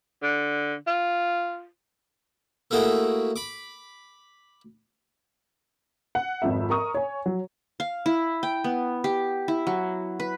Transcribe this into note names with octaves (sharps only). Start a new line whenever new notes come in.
D3
F4
A3 A#3 E4 F#4 G#4 G5
B5 D6
F#5
G#1 F2 E5
A#4 A#5 C#6 D#6
C#5 G#5
F#3
F5
E4
G5
B3
G4
E4
F#3
B4